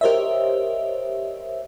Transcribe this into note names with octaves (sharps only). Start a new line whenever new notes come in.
G4 A#4 C5 C#5 D#5 E5